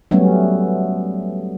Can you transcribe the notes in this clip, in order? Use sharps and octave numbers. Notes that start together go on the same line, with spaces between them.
F#3 G3 A3 B3 C#4